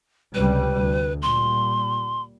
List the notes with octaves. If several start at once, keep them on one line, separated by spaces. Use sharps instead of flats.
C#2 C3 G3 B4
D2
A#2 G3 C6